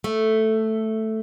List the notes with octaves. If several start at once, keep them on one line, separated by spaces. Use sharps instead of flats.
A3